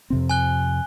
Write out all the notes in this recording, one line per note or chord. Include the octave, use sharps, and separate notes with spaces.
F2 C3 C4
G#5 F#6 G7